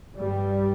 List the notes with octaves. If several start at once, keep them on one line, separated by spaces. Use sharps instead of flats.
G2 G3